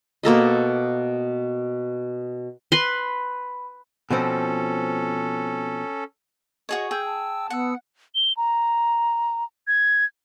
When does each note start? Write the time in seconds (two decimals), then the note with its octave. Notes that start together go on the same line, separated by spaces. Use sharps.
0.23 B2 A#3 A4 D#5
2.72 B4 B5 C6
4.11 B2 F3 C4 C#4 A4
6.69 F#4 G#4 C#5 D#5
6.91 G#4 G5 E6 G6
7.06 A5
7.50 B3 F#5 E6 C#7
8.15 G7
8.37 A#5
9.68 G#6